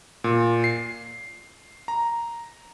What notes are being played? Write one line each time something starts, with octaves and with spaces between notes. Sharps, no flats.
A#2
C7
A#5